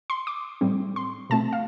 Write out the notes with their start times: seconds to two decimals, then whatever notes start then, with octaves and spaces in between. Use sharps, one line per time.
0.10 C6
0.27 D6
0.61 A2 G3 C4
0.96 C6
1.30 B2 A3 C4 A5
1.53 F5